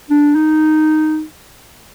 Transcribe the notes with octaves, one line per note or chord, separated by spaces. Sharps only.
D4
D#4